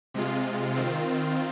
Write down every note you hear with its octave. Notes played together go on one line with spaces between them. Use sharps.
C3 G#3 F4
D#3 C4 F4